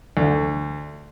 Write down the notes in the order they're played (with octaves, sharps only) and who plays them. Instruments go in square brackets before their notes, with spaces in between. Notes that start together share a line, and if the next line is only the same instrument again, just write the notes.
[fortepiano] D2